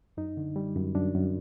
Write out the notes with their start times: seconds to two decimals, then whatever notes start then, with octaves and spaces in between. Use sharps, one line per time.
0.17 F#2 D#4
0.37 D3
0.56 G3
0.75 F#2
0.95 F#2 D4
1.14 F#2